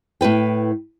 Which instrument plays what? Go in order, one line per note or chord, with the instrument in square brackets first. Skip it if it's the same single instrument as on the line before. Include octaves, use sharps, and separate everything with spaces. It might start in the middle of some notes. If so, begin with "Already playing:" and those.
[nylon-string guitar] A2 E4 B4 G5